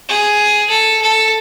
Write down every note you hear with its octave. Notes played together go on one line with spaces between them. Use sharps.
G#4
A4
A4